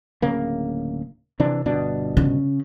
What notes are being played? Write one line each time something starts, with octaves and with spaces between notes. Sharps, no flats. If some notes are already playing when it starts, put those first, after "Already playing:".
D1 C#3 A#3
C3 E3 D4
G1 B2 D4
C#3